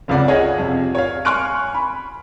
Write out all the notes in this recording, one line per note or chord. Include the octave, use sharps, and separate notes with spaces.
F1 C#2 C#3 D5 F#5
G#4 C#5 D#5 F5 F#5 G#5
F2 C3
C#5 F5
G#5 C6 C#6 F6 F#6 D7
B5